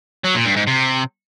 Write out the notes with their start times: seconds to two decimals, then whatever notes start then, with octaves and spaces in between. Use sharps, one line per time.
0.24 F#3
0.35 A#2
0.46 G2
0.57 G#2
0.67 C3